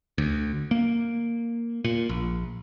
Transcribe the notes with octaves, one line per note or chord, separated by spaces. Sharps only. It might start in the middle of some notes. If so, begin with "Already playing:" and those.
D2
A#3
A#2
A#1